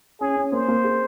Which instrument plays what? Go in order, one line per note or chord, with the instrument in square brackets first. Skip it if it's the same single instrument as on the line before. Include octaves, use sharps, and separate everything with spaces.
[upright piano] C#4 [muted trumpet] G#4
[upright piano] C#4
[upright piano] A#3 [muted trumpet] C5
[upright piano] A#3
G#4